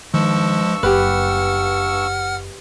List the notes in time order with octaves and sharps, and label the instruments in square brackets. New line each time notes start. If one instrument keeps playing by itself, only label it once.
[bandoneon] G2 C#6 E6 [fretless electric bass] D#3 [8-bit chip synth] F3 G#3
[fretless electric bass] F#1 [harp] G4 B4 [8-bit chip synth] F#5 F6